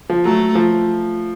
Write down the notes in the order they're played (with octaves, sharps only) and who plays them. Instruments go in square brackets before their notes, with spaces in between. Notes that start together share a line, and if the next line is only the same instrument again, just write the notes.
[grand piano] F3
[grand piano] F#3 [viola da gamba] A3
[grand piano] F3